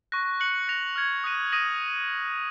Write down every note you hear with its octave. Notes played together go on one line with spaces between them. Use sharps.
C#6 F#6 A#6
F#6 C#7 F#7
F#6 A#6 F7
F6 G#6 C#7
D#6 F#6 A#6 D#7
D#6 A#6 D#7 F#7